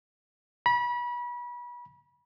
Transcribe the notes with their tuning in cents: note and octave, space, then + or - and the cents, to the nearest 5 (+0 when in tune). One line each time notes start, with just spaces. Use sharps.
B5 -30